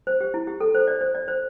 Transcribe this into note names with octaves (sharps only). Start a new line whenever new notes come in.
C5
G4
E4
G4
A4
C5
D5
C5
D5
C5